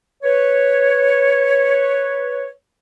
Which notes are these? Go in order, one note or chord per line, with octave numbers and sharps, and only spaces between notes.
B4 C#5